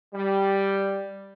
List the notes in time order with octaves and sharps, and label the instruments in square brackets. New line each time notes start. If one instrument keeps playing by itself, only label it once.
[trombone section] G3